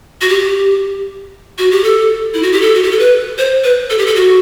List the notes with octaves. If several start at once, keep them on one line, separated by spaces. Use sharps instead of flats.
F#4
G4
F#4
G4
A4
E4
F#4
G4
A4
F#4
G4
A4
B4
C5
B4
A4
G4
A4
F#4